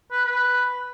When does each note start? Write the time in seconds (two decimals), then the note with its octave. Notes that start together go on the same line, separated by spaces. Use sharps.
0.11 B4
0.25 B4